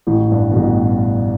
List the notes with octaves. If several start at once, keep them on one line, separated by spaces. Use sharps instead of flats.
A1 A2
G2
B2
A1 A2